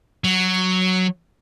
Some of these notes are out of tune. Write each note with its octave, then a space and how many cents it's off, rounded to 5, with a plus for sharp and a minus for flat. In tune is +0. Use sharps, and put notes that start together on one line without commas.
F#3 +0